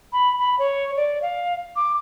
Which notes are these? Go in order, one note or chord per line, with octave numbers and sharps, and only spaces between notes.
B5
B5
C#5
D5
F5
D6